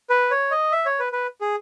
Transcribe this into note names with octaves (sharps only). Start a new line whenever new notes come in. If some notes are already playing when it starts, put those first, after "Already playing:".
B4
C#5
D#5
E5
C#5
B4
B4
G#4